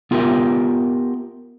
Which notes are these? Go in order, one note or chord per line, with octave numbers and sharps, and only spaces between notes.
B3 F4 G4 A#4 E5 G5